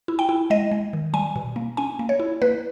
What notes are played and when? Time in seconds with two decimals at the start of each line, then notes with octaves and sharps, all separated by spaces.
0.08 E4
0.19 G5
0.29 E4
0.50 G#3 D#5
0.71 G#3
0.93 D#3
1.14 G3 G#5
1.36 B2
1.56 A#3
1.77 C#4 G#5
1.99 A#3
2.09 C#5
2.20 E4
2.42 A#3 B4